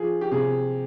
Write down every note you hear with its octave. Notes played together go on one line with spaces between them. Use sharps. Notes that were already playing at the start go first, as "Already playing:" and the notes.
Already playing: F3 G#4
G4
C3 G#4